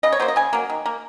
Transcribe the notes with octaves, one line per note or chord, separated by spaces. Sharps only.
C#3 D#5
C#5
F#3 A#3 C5
D#5
C#3 G#5
F#3 A#3
D#3
A#3